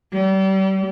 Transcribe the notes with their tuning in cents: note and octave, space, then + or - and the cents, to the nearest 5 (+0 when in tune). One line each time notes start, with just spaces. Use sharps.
G3 -35